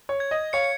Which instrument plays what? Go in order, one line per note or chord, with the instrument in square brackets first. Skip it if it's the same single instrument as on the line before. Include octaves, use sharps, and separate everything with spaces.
[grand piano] C#5
[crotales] G#6
[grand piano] D#5
[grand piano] C#5 F5 [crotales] C#7